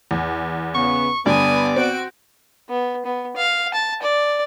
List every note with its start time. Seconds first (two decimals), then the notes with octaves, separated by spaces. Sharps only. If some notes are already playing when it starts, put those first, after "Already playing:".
0.11 E2
0.75 C#3 B3 C#6
1.26 G2 D3 G3 B3 D5 G#5 D#6
1.76 C4 F#4 D7
2.69 B3
3.06 B3
3.36 F5
3.74 A5
4.02 D5